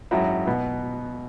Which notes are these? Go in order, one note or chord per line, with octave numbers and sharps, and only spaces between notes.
G#1 F#2 F#3 E4
B2 B3